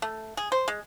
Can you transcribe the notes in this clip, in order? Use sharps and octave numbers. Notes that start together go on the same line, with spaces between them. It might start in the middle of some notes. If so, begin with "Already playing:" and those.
A3
G#4
C5
G#3